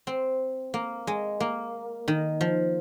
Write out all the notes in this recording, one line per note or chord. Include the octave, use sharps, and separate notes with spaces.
C4
A#3
G#3
A#3
D#3
F3